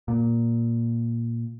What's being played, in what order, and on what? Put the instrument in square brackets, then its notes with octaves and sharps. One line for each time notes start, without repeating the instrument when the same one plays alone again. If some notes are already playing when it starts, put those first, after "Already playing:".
[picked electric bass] A#2